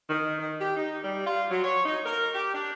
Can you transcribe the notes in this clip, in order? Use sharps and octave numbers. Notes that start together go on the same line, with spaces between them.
D#3
D#3
G4
D#4
G3
F4
F#3
C#5
D#4
A#4
G4
D4